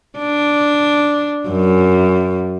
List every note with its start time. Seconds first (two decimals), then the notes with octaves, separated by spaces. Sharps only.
0.19 D4
1.49 F#2